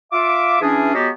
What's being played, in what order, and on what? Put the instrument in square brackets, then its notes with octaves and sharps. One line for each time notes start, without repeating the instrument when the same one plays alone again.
[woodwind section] F4 E5 D6
E3 C#4 D4 G#4
F#3 G#3 B3 F#4 G4